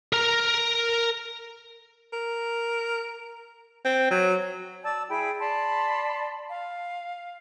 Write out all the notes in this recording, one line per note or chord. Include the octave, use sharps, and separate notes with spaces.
A#4 A#5
A#4
C4
F#3
D5 A5 E6
E4 G#4 G5 B5
D5 A5 B5 C6
F5